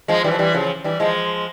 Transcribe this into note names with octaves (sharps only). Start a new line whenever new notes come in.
F3 G#3
E3 G3
F3
E3 G3
C#3 F3
E3 G3
F3 G#3